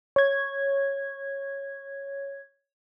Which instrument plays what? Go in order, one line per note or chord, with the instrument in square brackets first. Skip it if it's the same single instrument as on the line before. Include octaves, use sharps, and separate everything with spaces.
[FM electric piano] C#5 G#6